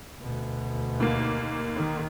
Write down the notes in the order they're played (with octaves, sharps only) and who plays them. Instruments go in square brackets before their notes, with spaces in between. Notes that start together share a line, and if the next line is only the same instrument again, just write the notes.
[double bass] D2 B2
[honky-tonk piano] D#2 A#3
[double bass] D#3